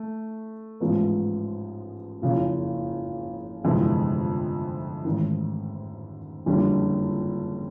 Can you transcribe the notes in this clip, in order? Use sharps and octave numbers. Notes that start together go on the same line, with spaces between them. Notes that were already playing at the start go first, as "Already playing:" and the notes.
Already playing: A3
A1 G#2 F3 G#3 B3
F#1 F2 C#3 F3
G1 F2 C3 E3 G#3
A1 G#2 D#3
F#1 F2 D3 G3